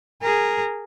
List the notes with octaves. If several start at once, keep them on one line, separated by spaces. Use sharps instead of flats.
G#4 A#4